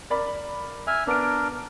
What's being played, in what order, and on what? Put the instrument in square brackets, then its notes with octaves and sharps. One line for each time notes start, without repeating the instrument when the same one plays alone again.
[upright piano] A#4 D5 B5
[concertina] E5 G#5 [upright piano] F6
[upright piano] B3 D7 [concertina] D4 A#4